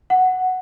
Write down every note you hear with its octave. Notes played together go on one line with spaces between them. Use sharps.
F#5